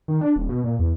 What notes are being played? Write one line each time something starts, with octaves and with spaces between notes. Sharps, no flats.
D#3
D4
D#1
B2
A#2
E2